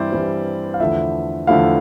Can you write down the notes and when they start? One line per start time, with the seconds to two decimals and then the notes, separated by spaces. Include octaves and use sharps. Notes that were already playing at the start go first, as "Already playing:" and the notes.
Already playing: G2 E3 G3 C4 E4 C5 D5
0.12 G2 E3 G3 C4 E4
0.74 F5
0.80 E2 D3 F3 A3 E4 E5
1.47 E2 D3 F3 A3 E4 F5